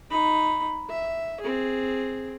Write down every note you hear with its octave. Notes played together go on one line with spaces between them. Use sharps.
D#4 B5
E5
C4 G#4